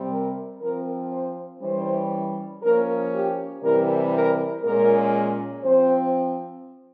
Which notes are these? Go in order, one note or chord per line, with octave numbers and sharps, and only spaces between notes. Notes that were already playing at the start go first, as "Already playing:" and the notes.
Already playing: C3 G3 C4
A#4
F3 C4 A#4
C5
E3 G3 C#4 C5
F3 A#3 C#4 A#4
G4
C3 E3 G3 A#4
A#4
A#2 G#3 C#4 A#4
F3 C4 C5